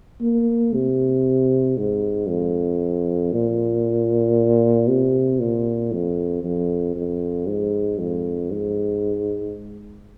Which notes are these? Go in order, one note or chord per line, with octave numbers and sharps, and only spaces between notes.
A#3
C3
G#2
F2
A#2
C3
A#2
F2
F2
F2
G#2
F2
G#2